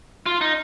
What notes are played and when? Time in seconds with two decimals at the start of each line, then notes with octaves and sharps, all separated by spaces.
0.26 F4
0.41 D#4